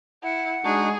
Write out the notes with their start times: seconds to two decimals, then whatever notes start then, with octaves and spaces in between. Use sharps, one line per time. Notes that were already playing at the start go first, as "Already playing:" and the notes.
0.23 E4 F#5
0.65 G#3 D4 D#4 F#4 G#4